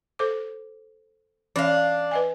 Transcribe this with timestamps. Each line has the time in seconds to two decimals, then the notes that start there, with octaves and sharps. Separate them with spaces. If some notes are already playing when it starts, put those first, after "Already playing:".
0.19 A4 C5 D6
1.56 E3 C#4 D4 C#5 F5
2.11 B4 D#5 G#5